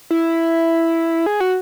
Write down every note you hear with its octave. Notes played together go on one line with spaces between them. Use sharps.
E4
G#4
F#4